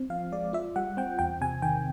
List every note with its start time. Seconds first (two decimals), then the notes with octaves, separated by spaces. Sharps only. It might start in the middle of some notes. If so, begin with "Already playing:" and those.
Already playing: C4
0.10 F3 F5
0.32 G#3 D5
0.53 F4 E5
0.76 G3 F#5
0.97 C4 G5
1.19 E2 G5
1.41 C3 G#5
1.62 D#3 G5